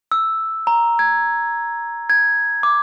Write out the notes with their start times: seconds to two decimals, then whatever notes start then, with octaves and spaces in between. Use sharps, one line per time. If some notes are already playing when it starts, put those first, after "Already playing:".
0.12 E6
0.67 A#5
0.99 G#6
2.10 G#6
2.63 D6